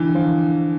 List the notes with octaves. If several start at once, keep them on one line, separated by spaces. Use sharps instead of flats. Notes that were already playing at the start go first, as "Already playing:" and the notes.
Already playing: D3 E3
F3